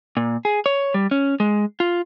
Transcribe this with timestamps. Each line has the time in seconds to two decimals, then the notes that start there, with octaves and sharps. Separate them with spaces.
0.17 A#2
0.45 G#4
0.66 C#5
0.94 G3
1.11 C#4
1.40 G#3
1.80 F4